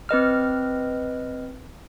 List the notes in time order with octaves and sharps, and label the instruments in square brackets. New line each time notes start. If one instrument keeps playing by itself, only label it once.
[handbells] C4 B4 D#5 F6